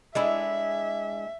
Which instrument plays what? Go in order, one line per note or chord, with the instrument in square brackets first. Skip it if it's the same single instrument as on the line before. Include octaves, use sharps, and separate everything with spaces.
[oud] G#3 D4 E4 [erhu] E5